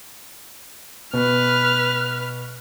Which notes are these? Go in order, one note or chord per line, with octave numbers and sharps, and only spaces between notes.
B2 B4 F6